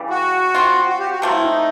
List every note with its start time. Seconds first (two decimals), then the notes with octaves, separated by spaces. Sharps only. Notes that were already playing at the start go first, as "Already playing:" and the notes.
Already playing: C#3 E3 G3
0.10 F#4
0.54 G3 C4 F4
0.89 F#4
1.00 G4
1.10 F#4
1.22 F#3 A3 C4 F4
1.33 E4
1.44 D#4